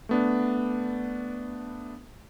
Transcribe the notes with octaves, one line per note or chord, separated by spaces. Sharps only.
A3 B3 D4